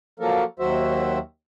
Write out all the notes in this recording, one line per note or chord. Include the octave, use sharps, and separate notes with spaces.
F3 F#3 A#3 A4 A#4
D#2 D#3 F#3 F#4 C5 E5